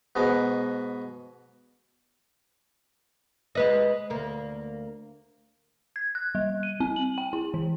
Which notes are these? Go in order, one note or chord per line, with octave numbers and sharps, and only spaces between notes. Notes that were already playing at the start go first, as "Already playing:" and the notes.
G#2 B2 B3
G#3 B4 D#5
D2 A#3
G#6
F#6
G3
D#7
C4
F#7
G5
E4
E3